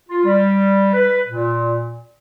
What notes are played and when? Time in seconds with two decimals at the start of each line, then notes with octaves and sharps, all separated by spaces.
0.09 F4
0.24 G3
0.93 B4
1.27 A#2